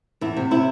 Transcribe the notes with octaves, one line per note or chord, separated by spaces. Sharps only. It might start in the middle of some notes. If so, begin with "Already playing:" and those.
E2 E4
C3
C3 E4